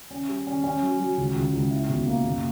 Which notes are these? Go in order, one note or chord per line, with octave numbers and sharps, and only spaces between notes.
C#4
G3
C#4
C#4
F#3
F#3
C#2
C#2
C#2
E4
B1
A#3
F#1